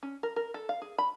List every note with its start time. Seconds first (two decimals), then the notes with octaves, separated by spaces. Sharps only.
0.03 C#4
0.23 A#4
0.36 A#4
0.54 A4
0.69 F5
0.82 G#4
0.98 B5